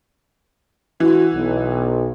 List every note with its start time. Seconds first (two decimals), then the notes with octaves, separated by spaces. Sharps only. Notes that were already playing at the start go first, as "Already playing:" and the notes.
1.00 E3 F#4
1.34 B1